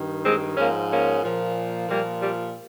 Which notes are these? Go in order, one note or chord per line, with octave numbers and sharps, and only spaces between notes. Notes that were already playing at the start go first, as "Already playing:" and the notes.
Already playing: G2 D#3
G#3 C4
G#2 F3 A#3 C#4
A#3 C#4
A#2 F3
A#2 F3 G3 A#3
G3